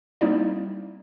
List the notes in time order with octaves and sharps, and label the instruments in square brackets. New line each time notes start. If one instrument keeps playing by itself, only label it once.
[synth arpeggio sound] G3 A#3 C4 D#4 E4 D5